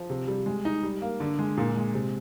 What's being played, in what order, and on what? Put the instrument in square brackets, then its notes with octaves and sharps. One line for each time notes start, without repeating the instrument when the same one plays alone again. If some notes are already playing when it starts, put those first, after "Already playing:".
Already playing: [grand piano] F3
C3
G3
G#3
D#4
G3
A#3
D3
G#3
A#2
G#3
C3